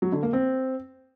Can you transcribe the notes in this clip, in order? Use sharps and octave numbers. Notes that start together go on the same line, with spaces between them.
F#3
D3
A#3
C4